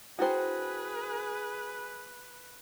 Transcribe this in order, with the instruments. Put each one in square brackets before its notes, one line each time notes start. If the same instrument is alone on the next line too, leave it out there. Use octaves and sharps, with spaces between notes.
[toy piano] D4 E4 G5 [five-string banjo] F#4 C5 [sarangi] G#4 [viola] B4